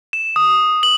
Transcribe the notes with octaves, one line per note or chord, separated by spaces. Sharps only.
E7
D#6
F#7